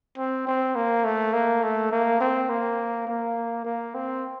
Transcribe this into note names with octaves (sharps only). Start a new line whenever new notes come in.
C4
C4
A#3
A3
A#3
A3
A#3
C4
A#3
A#3
A#3
C4